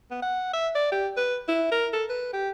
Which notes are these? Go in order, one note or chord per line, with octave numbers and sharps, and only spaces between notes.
B3
F#5
E5
D5
G4
B4
E4
A#4
A4
B4
G4